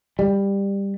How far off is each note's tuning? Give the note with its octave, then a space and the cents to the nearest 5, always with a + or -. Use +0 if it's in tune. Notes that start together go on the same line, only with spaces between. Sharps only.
G3 +15